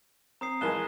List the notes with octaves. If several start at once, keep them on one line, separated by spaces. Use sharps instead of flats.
C4 A#5 D#6 C7
A#1 E3 G#3 E7 G7